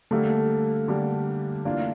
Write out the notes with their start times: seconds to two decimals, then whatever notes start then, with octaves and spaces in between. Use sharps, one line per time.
0.11 D3 G3 A3 A#3 D4 G4
0.88 D3 G3 A#3 D4 G4
1.65 E3 A#3 D4 F4